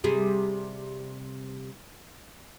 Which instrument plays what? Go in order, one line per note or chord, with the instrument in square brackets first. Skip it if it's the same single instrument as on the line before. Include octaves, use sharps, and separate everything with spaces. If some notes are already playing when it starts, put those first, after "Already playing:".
[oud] C3 G3 G#4